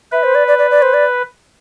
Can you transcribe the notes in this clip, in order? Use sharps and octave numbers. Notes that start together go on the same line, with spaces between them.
B4 E5
C5
D5
D5
D5
D5
C5
D5